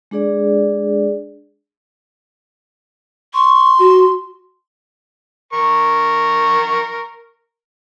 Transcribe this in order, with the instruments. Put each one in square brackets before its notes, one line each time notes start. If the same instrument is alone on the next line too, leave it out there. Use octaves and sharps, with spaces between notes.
[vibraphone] G#3 D4 G#4 D5
[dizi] C6 [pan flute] C#6
[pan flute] F#4
[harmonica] A#4 C#6